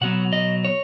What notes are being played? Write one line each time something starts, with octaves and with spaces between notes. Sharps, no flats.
B2 F#3 B3 F#5
D#5
C#5